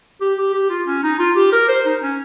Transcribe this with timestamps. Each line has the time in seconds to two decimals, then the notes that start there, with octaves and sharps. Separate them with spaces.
0.21 G4
0.38 G4
0.54 G4
0.70 F4
0.87 C#4
1.03 D#4
1.19 F4
1.36 G4
1.53 A#4
1.68 C5
1.86 D#4
2.02 C#4